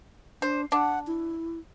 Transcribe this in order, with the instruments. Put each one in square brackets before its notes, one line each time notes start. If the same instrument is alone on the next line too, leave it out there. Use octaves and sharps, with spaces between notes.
[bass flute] D4 [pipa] C5
[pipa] D4 [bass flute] F#5
[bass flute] E4